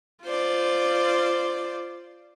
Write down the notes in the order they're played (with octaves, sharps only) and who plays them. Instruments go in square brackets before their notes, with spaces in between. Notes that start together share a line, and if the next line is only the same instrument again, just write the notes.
[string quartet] F4 C5 D5